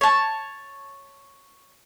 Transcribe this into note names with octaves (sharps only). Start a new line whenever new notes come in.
C#5 A5